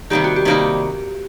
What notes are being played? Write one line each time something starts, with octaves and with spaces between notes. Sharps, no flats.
C3 D#3 G3 A#3 D#4 G4
F#4
G4
C3 D#3 G3 A#3 D#4